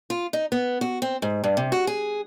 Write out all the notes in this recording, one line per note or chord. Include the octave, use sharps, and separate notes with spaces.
F4
D#4
B3
F#4
C4
G#2
G2
C3
F#4
G#4